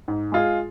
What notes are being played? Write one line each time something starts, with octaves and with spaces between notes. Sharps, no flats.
G#2
G#3 F4 G#4